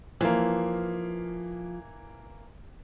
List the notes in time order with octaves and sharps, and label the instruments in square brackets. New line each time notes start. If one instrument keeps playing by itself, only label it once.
[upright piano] E3 A#3 [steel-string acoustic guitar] F3